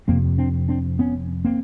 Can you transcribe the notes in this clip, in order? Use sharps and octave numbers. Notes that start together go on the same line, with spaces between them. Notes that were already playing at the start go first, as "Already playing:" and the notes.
F2 C3 A#3 C4
C4 D4
C4 D4
B3 C#4
A#3 C4